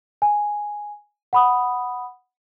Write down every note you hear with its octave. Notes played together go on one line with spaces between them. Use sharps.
G#5
F#5 B5 D#6